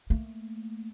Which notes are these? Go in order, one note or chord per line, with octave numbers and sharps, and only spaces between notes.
A3 A#3